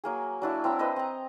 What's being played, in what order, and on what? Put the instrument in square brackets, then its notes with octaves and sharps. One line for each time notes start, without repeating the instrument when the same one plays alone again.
[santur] F#3 A#3 G#4
F#3 D4 E4
C4 E4 A#5 E6
B4 C5 D#5
C4 A#5